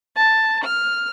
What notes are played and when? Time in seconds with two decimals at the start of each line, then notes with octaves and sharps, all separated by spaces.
0.16 A5
0.64 F6